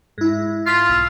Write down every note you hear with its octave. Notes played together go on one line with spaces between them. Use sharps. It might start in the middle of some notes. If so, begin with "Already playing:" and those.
G#2 E4
F4 C6 B6
B1 E6